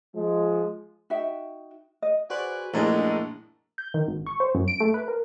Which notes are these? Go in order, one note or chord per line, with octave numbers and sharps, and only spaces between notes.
F3 G#3
D#4 F#4 E5 G5
D#5
F#4 G#4 B4 C5 D5 F#6
A#1 F#2 G#3 A3 D4 E4 A#4 A5
G6
D#3
G#1
C#6
C5
F#2
D7
A3
B4
A#4